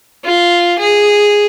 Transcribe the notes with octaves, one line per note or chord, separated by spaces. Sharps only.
F4
G#4